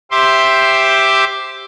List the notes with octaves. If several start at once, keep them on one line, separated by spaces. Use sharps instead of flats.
G4 C5 E5 C6 D6